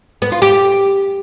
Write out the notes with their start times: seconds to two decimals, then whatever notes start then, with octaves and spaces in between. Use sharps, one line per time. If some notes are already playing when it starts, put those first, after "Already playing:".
0.22 B3
0.32 F4
0.42 G4